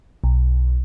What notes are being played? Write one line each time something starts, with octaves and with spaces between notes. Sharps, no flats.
B1